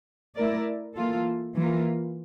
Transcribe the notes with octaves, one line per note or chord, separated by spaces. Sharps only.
A3 E4 A#4 D5
E3 A#3 F4 A4
E3 A#3 F4 A#4